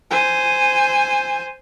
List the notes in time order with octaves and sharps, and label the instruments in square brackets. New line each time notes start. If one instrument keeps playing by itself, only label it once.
[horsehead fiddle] C5 G#5